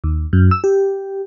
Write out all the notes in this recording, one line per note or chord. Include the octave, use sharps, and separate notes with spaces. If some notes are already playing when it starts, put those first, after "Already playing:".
D#2
F#2
E6
G4